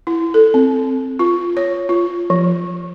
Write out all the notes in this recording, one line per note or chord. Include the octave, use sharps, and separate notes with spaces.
E4
A4
C4
F4
C#5
F4
F3